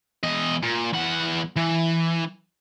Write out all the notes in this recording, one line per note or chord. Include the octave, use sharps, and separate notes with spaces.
E2 D#5
A#2
E2 F#5
E3